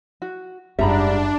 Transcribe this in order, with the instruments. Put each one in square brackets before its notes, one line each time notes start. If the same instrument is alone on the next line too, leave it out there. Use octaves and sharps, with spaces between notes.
[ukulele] F#4
[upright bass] F#1 F4 [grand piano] G#2 G3 [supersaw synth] D4 [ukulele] E5 A#5 B5